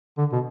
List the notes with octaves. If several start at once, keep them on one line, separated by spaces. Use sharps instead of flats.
D3
B2